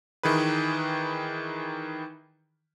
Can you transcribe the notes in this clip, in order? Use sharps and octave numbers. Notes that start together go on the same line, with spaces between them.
D#3 E3 G#4 B4